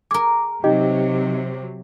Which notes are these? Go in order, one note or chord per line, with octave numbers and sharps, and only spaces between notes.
G#4 A#4 D6
C3 F#3 D#4 G4 D#5